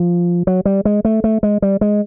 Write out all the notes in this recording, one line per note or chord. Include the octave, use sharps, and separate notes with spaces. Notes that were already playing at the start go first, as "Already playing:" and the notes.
Already playing: F3
F#3
G3
G#3
A3
A3
G#3
G3
G#3